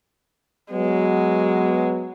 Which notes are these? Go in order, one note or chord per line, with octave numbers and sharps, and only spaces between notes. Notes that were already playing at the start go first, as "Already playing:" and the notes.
F#3 G#3 B3